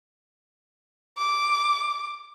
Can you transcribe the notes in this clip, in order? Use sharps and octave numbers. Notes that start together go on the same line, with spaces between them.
D6